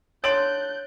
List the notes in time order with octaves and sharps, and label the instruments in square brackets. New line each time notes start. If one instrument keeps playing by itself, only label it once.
[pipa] D3 C6 [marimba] C#5 [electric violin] F#6 G6 [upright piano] A6 D7 F#7